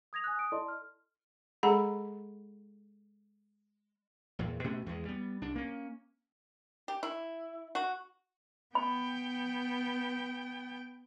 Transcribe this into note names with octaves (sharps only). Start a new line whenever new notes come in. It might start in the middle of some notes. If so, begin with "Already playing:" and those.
D#6 G#6 A#6 F7
G#5 D#6 F#6
D#6 D7
E4 A4 D5 D#5 A5 C6
F6
G#3 G#4 A4 F#5 A#5 B5
E2 A#2
B2 A3 B3 C#4
E2 G#3
G3 B3
C2 D4
A#3 C#4
G4
E4
F#4
B3 G5 B5